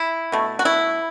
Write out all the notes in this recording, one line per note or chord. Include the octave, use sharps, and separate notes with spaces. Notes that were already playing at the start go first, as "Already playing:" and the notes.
Already playing: E4
B2 A3
F#4
E4